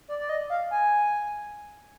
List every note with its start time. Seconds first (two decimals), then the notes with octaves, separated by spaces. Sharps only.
0.08 D5
0.20 D5
0.29 D#5
0.50 F5
0.71 G#5